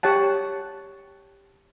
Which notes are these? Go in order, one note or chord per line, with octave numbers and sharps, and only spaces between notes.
G4 C#5 F#5 A5